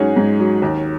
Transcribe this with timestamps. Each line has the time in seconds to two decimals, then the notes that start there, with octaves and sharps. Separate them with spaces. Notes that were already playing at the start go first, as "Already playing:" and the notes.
Already playing: G#2 F#3 C#4 D#4 F#4 G#4
0.16 G#2
0.39 F#3
0.62 D#2